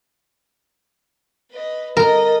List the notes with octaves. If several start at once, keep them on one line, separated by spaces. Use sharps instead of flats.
B4 D#5
A4 A#4 D#5